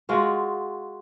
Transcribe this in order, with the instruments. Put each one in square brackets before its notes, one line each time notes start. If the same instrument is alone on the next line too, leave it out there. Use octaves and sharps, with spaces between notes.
[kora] G#3 F4 F#4